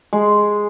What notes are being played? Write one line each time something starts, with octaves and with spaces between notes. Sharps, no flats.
G#3